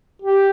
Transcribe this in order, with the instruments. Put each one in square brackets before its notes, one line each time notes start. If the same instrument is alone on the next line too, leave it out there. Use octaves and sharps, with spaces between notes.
[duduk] G4